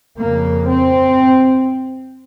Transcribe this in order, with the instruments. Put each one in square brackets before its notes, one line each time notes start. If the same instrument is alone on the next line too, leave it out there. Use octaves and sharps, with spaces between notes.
[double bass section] F2 C#3 A#3
C4